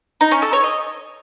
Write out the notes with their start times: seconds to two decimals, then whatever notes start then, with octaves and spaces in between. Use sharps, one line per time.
0.21 D#4
0.32 C#4
0.42 A4
0.53 C#5
0.64 D#5